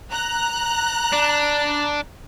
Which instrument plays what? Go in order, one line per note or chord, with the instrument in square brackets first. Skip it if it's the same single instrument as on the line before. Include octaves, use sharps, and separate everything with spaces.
[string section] A#5 F#6
[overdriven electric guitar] D4